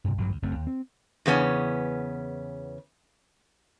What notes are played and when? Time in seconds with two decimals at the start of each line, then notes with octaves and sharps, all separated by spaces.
0.04 G2 C3
0.18 A1 G2 F3 F#3
0.30 D2
0.42 F#1 F#2 A3 C4
0.55 D#2
0.67 C4
1.26 E2 C#3 B3 C#4